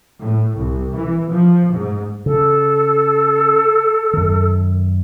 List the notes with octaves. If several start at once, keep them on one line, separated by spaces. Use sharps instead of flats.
A2
C2
E3
F3
G#2
C#3 A4
F#2 D#3